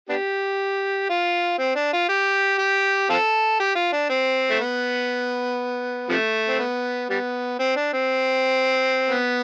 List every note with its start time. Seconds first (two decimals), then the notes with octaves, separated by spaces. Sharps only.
0.09 B3 D4 G4
1.09 F4
1.58 C4
1.76 D4
1.93 F4
2.09 G4
2.58 G4
3.10 C4 F4 A4
3.60 G4
3.75 F4
3.92 D4
4.09 C4
4.50 A3
4.60 B3
6.09 C3 F3 A3
6.48 C4
6.59 B3
7.10 G3 B3
7.59 C4
7.76 D4
7.93 C4
9.09 B3